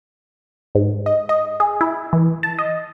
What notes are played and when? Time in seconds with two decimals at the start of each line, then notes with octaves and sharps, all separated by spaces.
0.75 G#2
1.06 D#5
1.29 D#5
1.60 G#4
1.81 E4
2.13 E3
2.43 A5
2.59 D#5